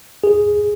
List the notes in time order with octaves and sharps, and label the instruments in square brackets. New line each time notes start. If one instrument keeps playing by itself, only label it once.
[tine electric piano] G#4